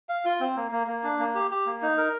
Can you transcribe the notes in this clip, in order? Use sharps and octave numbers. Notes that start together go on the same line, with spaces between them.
F5
F4
C4
A#3
A#3
A#3
D4
A#3
G4
G4
A#3
D#4
A#4